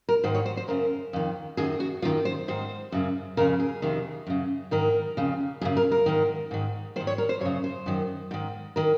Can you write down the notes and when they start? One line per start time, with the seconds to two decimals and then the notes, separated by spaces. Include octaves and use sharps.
0.09 A#4
0.24 G#2 D#3 C5
0.35 C#5
0.46 C5
0.57 C5
0.68 F#2 C#3 A#4
1.13 F2 D#3
1.57 F#2 D#3 G#4
1.80 F#4
2.02 F#2 F4
2.05 D#3
2.25 C5
2.48 G#2 D#3 C5
2.92 F#2 C#3
3.37 F2 C#3 A#4
3.60 G#4
3.82 F2 C3 D#3
4.27 F#2 C#3
4.71 G#2 D#3 A#4
5.17 F2 C#3
5.61 F#2 G#4
5.65 C#3
5.77 A#4
5.91 A#4
6.06 G#2 D#3
6.51 G#2 D#3
6.96 D#3 C5
7.00 G#2
7.07 C#5
7.18 A#4
7.29 C5
7.41 F#2 C#5
7.45 C#3
7.64 C5
7.86 F#2 D#3
8.31 G#2 D#3
8.76 D#3 A#4